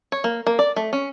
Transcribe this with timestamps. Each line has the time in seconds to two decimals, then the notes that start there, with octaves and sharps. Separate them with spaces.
0.12 C#5
0.24 A#3
0.47 A#3
0.59 D5
0.76 A3
0.93 C#4